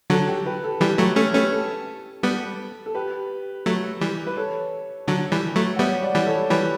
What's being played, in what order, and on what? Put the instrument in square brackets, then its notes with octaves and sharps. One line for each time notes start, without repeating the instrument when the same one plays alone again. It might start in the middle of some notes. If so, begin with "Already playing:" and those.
[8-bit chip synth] D3 F#3 [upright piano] A4
[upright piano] G4
G4 B4
A4
[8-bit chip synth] E3 G3 [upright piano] G4
[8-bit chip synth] F#3 A3 [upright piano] G4
[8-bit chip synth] A3 C#4 [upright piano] A4
[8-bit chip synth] A3 C#4 [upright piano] G4 B4
[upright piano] A4
[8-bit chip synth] G3 B3
[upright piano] A4
G4 B4
[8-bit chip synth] F#3 A3
E3 G3
[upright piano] B4
A4 C#5
[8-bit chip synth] D3 F#3
E3 G3
F#3 A3
[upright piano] F#5
[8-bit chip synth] G3 B3 [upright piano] C#5 E5
[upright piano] D5 F#5
[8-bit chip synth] E3 G3
[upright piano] A4 C#5
[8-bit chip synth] E3 G3 [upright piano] G4 B4